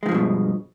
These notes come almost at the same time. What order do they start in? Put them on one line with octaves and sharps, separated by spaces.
G#3 D#3 F3 G2 B2